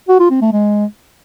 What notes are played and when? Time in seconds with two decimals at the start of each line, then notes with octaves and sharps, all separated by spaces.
0.09 F#4
0.20 F4
0.31 C4
0.42 A3
0.53 G#3